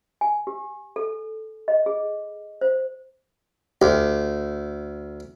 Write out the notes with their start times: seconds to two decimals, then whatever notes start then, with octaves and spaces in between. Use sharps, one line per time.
0.21 G#5
0.47 G4
0.96 A4
1.68 D#5
1.86 G#4
2.61 C5
3.82 D2 G4